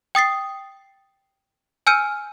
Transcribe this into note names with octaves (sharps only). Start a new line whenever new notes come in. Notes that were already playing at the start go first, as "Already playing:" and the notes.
G5 D#6 A6 C7
G#5 E6 F6 G6 C#7 D#7